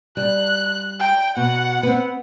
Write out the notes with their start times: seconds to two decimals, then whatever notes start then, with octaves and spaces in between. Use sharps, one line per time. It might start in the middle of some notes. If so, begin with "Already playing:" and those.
0.17 G3 F#6
1.00 G5
1.37 B2 F#5
1.83 B3 C4